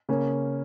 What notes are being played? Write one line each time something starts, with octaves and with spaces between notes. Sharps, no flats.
C#3 A#3 C#4